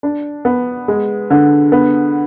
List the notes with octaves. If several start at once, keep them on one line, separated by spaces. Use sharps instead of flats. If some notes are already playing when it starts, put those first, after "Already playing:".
D4
B3
G#3
D3
B3